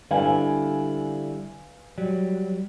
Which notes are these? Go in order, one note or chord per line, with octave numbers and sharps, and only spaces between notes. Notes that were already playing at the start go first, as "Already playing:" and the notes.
D3 G3 E4 B4 F5 G#5
F#3 G3